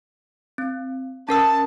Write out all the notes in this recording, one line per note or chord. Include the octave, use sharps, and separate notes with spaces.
C4
C#4 A#4 A5 E6